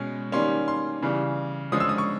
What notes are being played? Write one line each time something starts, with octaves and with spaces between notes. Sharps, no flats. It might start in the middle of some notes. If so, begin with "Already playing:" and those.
Already playing: B2 G#3 C#4
D#3 G3 A#3 C#4 C6
C6
C#3 E3 G3
D3 F3 G#3 C#4 D#6
E6
D#6
C#6